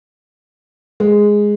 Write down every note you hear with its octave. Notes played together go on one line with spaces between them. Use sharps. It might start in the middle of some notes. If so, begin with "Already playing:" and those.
G#3